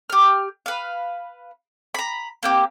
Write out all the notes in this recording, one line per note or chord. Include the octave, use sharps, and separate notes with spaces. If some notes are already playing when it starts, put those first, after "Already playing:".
G4 F6
B4 F5
A#5 B5
A#3 C4 G4